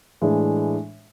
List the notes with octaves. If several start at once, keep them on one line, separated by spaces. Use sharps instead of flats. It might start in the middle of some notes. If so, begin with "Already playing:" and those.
A2 E3 G#3 D4